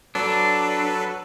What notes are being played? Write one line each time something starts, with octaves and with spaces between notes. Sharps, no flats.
F#3 D4 A4 B4